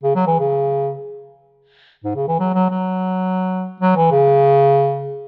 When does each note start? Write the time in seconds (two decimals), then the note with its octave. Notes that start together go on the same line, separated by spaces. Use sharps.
0.03 C#3
0.15 F#3
0.27 E3
0.39 C#3
2.04 G#2
2.16 C#3
2.28 E3
2.40 F#3
2.54 F#3
2.70 F#3
3.80 F#3
3.96 E3
4.11 C#3